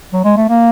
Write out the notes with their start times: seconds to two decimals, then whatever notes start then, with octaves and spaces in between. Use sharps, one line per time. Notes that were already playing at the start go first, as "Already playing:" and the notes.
0.13 F#3
0.24 G#3
0.37 A3
0.49 A#3